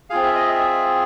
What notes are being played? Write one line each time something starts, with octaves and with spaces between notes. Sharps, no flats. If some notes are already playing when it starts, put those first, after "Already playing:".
C4 F4 G#4 F5
E5
D#5
E5